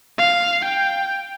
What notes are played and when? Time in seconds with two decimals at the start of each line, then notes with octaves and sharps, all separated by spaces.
0.18 F5
0.65 G5